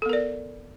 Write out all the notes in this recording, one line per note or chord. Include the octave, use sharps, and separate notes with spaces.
B3 A4 A#4 D5